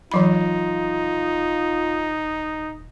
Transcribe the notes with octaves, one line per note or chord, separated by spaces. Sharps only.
D#1 E3 F#3 D#4 F4 B5